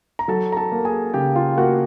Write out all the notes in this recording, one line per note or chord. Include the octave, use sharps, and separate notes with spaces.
A#5
F#3 A4 A5
A#5
A4 A5
A#3
G#4 G#5
C#3 G4 G5
F4 F5
A#3 F#4 F#5